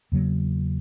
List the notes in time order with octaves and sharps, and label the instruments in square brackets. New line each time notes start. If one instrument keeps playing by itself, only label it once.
[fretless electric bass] E2 C#3 F#3 A#3